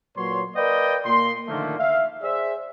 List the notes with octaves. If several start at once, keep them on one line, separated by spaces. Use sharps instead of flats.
A#2 F#3 B4 C#5 C6
A#4 B4 D5 D#5 F5 G5
A#2 C6
A#2 D3 D#3 F3 A3 A#3
E5 F5
G#4 C5 D5 E5